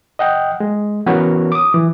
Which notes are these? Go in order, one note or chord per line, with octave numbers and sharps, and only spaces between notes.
D#5 F#5 G5
G#3
E3 B3 C#4 F#4 A#4 C#5
D6 D#6
E3